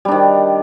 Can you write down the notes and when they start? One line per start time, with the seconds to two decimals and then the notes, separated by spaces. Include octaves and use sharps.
0.05 G3
0.08 D4
0.12 D#3